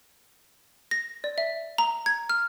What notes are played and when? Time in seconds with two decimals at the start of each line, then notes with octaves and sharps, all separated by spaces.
0.91 A#6
1.24 D5
1.38 E5
1.78 A#5
2.06 G#6
2.29 F6